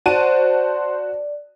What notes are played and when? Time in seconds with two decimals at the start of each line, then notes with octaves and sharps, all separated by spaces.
0.06 F#4 C5 D5 A5 D#7